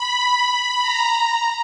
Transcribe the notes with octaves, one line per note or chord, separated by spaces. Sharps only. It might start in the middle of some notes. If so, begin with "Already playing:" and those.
Already playing: B5
A#5